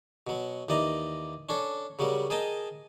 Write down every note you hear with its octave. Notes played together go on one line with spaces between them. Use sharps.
B2 F#3
D#2 E3 D5 D#5 A#5
C#4 D4 A4
C#3 F#3 G3 A#4
G#4 A#4 D#5 G5 A5 A#5